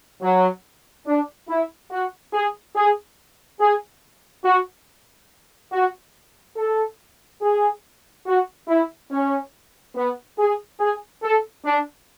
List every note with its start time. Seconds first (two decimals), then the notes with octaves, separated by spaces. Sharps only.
0.21 F#3
1.06 D4
1.49 E4
1.91 F#4
2.33 G#4
2.75 G#4
3.60 G#4
4.44 F#4
5.72 F#4
6.57 A4
7.41 G#4
8.26 F#4
8.68 E4
9.11 C#4
9.96 B3
10.38 G#4
10.80 G#4
11.23 A4
11.65 D4